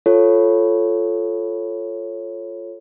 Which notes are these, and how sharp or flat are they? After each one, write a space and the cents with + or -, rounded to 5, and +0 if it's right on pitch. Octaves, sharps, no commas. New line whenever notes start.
F4 +0 A4 +0 C#5 -10